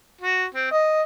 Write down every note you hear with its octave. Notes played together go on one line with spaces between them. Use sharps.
F#4
C4
D#5